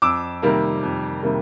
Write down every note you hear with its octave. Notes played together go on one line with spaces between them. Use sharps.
F2 D6 E6
C3 D#3 G3 A#3
F2
C3 D#3 G3 A#3